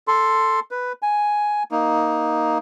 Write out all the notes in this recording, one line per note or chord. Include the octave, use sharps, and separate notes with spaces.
A4 C6
B4
G#5
A#3 D#4